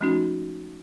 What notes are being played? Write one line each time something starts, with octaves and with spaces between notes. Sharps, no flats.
F3 G#3 A3 C#4 D#4 F#4